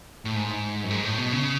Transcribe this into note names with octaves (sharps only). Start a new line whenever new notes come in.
A2
G#2
F#2
G#2
A2
B2
C#3